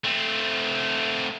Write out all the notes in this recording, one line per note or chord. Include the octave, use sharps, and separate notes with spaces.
A3 C4